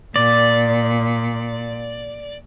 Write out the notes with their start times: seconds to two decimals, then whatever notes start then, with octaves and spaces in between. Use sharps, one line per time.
0.16 A#2 D5